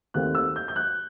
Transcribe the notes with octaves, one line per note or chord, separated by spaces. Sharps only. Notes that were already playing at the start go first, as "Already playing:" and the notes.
D#2 D#3 A3 C4 F#6
E6
G6
G6
F#6